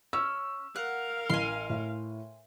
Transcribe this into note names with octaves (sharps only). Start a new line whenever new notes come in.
C#4 E6
A#4 F5 F#5
A1 G#5 C6
A2